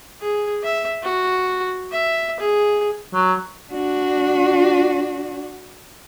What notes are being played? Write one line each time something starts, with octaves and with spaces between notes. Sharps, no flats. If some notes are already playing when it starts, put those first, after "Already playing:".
G#4
E5
F#4
E5
G#4
F#3
D4 F#4